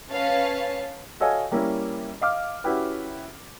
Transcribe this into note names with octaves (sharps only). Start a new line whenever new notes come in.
C#4 B4 C#5 F5 A5
F#4 A4 C#5 D#5 F5 G#5
G3 A#3 C#4 E4 A#4
D#5 F5 D6 F6
C#4 E4 F#4 G4 B4